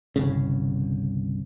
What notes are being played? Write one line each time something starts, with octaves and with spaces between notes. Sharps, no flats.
G1 C2 C#3